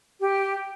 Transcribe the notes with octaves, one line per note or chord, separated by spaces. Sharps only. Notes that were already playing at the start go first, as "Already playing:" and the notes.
G4